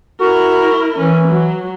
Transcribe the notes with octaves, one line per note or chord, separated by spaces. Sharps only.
E4 F#4 A#4
E3 C#4
F#3